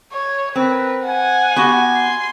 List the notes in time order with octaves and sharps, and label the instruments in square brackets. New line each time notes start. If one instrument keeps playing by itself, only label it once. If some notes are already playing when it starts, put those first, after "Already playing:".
[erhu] C#5
[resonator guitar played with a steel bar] C4 [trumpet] A#4 [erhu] B4
[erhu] F#5 [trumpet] G#5
[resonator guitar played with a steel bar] B3 F#4 G4
[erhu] C6